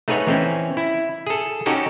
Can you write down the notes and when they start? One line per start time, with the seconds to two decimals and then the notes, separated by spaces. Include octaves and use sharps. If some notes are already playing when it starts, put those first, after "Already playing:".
0.08 A3 D#4 G#4 B4 C#5 F#5
0.27 E3 C4 C#4
0.77 E4
1.27 G#4 A4
1.66 C#4 D#4 F#4 G4 A4